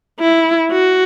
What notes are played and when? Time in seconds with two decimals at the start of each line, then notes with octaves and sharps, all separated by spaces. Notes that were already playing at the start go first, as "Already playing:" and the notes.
0.20 E4
0.71 F#4